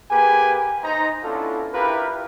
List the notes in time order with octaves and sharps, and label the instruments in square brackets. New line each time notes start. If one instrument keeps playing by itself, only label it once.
[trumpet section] A#3 G4 G#4 B4 G#5
D#4 C5 A#5
B3 C#4 D4 E4 F4 A4
E4 F4 G4 A#4 B4